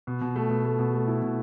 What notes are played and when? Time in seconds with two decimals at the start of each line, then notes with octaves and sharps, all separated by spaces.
0.07 B2
0.21 B2
0.36 A3
0.50 B2
0.65 A3
0.79 B2
0.93 A3
1.07 E4
1.22 B2